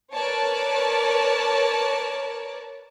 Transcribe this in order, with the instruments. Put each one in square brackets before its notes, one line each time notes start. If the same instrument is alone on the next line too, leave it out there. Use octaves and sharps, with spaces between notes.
[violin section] A#4 B4 C#5 D5 A5